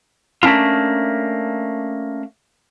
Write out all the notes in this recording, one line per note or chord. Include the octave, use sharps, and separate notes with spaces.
A3 A#3 C#4 D4 F4